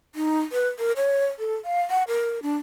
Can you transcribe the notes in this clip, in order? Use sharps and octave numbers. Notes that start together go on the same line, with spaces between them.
D#4
B4
A#4
C#5
A4
F5
F#5
A#4
D4